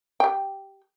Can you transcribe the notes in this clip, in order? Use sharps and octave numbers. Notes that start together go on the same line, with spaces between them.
G4 G5